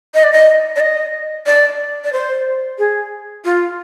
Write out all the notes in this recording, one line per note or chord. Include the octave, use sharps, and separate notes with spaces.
D#5
D5
D#5
D5
D#5
D5
D5
C5
G#4
F4